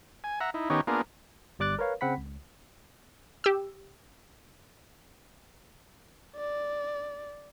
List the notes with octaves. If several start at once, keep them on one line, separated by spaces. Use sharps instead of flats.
G#5
E5 F#5 A#5
D#4 E4
D#3 B3 C#4 D#4 G4 C#5
A#3 B3 D4 F4 G#4 A#4
G1 G3 D5 D6 F#6 A6
A#4 B4 C#5 F5
C#3 C4 F#5 B5 B6
C#2
G4 E6
D5